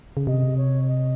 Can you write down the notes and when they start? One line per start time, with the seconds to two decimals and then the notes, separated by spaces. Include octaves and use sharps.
0.17 C#3
0.27 C3 D#5
0.57 C#5
0.87 D#5